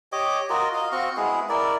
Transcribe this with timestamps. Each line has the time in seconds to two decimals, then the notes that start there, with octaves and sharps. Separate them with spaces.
0.12 G4 C#5 D#5 D6
0.50 F4 F#4 A#4 D#5
0.74 D#5 F5
0.92 C4 F#4 F5 C#6
1.17 G#3 B3 E4 G#4
1.49 E4 A#4 D5